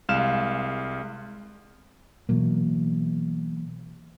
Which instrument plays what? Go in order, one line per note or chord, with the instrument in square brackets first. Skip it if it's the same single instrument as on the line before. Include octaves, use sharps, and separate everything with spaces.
[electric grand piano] C2 G#3 F5 F6 E7
[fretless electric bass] B2 E3 F#3 A#3